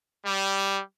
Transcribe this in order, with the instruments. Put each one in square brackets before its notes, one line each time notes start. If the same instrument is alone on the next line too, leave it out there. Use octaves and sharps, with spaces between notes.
[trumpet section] G3